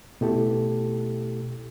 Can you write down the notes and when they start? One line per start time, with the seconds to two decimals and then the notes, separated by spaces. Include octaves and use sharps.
0.21 B2 A3 E4 G4 A4